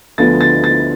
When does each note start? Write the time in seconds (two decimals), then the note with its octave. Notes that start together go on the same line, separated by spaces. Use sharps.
0.18 D2 D3 F3 B3 A6
0.41 A6
0.64 A6